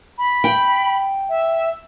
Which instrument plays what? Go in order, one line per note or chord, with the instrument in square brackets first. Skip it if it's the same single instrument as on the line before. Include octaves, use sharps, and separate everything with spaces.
[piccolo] B5
[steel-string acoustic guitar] G5
[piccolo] E5